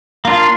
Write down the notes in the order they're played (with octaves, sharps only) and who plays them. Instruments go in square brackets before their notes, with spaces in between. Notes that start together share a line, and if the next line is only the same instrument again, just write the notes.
[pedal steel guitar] A#3 D4 F4